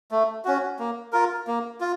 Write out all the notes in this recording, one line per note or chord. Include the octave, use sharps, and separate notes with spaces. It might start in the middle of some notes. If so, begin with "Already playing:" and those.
A3
C#4 F#4
A#3
F4 A#4
A#3
F4